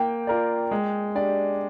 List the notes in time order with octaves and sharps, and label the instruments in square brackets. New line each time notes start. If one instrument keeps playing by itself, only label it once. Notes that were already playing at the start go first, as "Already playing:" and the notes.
Already playing: [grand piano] A#3 [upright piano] G5
[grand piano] F4 A#4 D5
G#3
D4 G4 D5